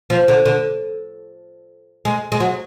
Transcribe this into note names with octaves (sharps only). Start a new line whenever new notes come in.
F3
D3
D3
G#3
G#3
F#3